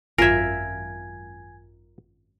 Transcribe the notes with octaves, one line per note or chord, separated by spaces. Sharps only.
G#1 F#2 F4 A#4 E5 G#5 G#6 B6